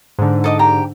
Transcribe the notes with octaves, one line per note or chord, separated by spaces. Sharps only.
G#2 D3
A4 D#5 D6
G4 A#5